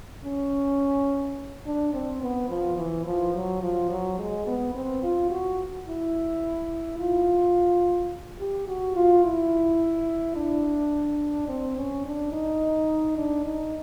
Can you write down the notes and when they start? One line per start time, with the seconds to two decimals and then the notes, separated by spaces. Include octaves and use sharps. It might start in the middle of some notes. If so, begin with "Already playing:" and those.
0.24 C#4
1.66 D4
1.94 C4
2.22 B3
2.50 F3
2.77 E3
3.06 F3
3.34 F#3
3.63 F3
3.90 F#3
4.19 G#3
4.47 B3
4.75 C4
5.03 F4
5.30 F#4
5.87 E4
6.99 F4
8.39 G4
8.68 F#4
8.96 F4
9.24 E4
10.36 D4
11.49 C4
11.77 C#4
12.05 D4
12.32 D#4
13.17 D4
13.45 D#4